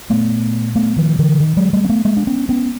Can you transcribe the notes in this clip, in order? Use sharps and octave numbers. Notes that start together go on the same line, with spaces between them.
A#2 A3 B3
A3 B3
D#3 F3
D3 E3
D#3
F#3 G#3
G3 A3
C4
A3 B3
G#3 A#3
D4
B3 C#4
B3 C#4